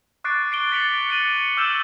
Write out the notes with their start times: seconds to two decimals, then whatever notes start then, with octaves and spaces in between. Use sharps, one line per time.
0.24 C#6 D6 F#6 A6 C7 D7
0.52 C7 D7 G7
0.72 A6 B6 C#7 D7 F7 F#7
1.09 F#6 C#7 D#7 F#7
1.57 D6 E6 F6 G6 C#7 E7